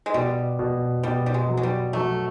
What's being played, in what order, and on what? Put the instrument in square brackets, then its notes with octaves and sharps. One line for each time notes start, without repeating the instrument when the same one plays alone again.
[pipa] G#3
[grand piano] B2 [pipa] G3
[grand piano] B2
[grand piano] B2 [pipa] G3
[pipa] G3
G#3
[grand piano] F#3
[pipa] G#3
G3
[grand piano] F#3 [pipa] A3